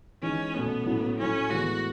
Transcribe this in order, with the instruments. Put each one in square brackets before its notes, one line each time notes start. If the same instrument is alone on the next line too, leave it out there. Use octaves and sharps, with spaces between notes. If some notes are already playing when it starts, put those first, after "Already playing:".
[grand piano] E3 G#3 D#4 [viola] C#4
[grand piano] B2 A3 C#4 [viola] B3
[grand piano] A2 F#3 A3 C#4 E4
[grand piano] A2 F#3 A3 E4 [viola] C#4
[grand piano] A2 E3 G#3 B3 [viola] F#4